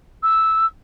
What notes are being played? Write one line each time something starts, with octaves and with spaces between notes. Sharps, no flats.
E6